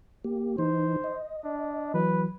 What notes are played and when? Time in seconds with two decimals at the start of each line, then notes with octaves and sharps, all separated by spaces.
0.24 A#3 G4
0.58 E3 D#4 C5
1.04 D#5
1.44 D4
1.94 E3 F#3 B4